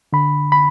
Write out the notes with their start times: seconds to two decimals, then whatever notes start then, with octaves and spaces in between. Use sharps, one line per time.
0.13 D3 B5
0.52 B5